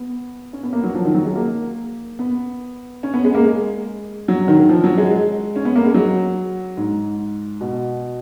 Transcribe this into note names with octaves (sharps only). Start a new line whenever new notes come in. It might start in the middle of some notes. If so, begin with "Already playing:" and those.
Already playing: B3
C#4
B3
A#3
F#3
F3
D#3
F#3
G#3
A#3
B3
C#4
B3
G#3
A#3
G#3
F#3
D#3
D#3
F3
F#3
G#3
G#3
C#4
B3
A#3
G#3
F#3
G#2
B2